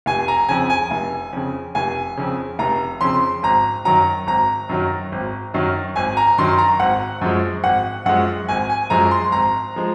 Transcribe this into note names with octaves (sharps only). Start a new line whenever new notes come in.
F1 G#5
A#5
F2 C#3 G#5
G#5
F1
F2 C#3
F1 G#5
F2 C#3
F1 A#5
F2 C#3 C6
G#1 A#5
F#2 D#3 F#3 A#5
G#1 A#5
F#2 D#3 F#3
G#1
F#2 D#3 F#3
G#1 G#5
A#5
F#2 D#3 F#3 C6
A#5
G#1 F#5
F#2 F3 G#3
G#1 F#5
F#2 F3 G#3 F#5
G#1 G#5
G#5
F#2 F3 G#3 A#5
C6
G#1 A#5
F3 G#3